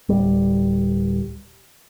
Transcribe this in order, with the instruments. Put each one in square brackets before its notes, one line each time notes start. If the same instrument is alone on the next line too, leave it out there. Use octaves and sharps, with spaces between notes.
[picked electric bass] D1 G3